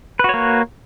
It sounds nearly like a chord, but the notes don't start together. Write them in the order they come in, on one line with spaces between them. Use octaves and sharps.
B4 F#4 C#5 A#3